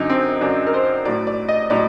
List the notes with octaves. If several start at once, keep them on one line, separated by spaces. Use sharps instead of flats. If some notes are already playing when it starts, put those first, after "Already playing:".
Already playing: F#2 D3 F#3 D#4
C4
F#2 D3 F#3 D4
A#4
C5
A2 F#3 D5
D5
D#5
A2 F#3 D5